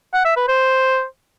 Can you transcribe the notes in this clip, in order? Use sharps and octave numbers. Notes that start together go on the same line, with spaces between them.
F#5
E5
B4
C5